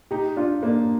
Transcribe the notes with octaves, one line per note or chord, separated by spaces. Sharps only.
D#4 G4
D4 F4
A#3 D4